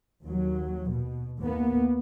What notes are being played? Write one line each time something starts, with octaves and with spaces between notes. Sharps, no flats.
D#2 F#3
B2
D#2 A#3 B3